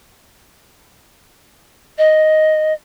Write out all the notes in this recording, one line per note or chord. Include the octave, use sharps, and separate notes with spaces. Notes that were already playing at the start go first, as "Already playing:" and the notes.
D#5